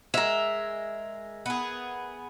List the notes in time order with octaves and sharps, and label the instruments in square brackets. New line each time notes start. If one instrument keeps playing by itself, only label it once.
[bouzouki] G#3 [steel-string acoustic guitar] A#4 E5
[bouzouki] B3 G#4